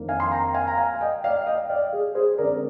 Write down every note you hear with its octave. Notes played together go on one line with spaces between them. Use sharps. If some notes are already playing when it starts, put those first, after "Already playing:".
Already playing: F2 D#3 A#3 D4
F5 G#5
C6
G5 A#5
F5 G#5
A#5
F5 G#5
D#5 G5
D5 F5
D#5 G5
D5 F5
G#4
G#4 C5
D3 G#3 C4 A#4 D5